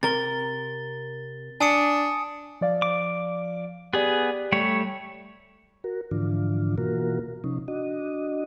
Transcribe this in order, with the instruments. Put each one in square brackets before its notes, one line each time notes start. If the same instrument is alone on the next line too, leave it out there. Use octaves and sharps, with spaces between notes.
[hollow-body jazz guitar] C3 A#4 [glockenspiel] A6 G7
[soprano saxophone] D4 [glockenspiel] G#5 D#6 C#7
[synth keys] F3 D5 F5
[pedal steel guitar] D6
[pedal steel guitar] B3 G#4 [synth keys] G4 D5
[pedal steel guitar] G3 A3 C#5
[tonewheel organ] F#4 A#4
G#2 D3 E3 F3 D4 F4
B2 E3 A#3 F4 F#4 A#4
C3 F3 C#4 D#4
D4 F#4 D#5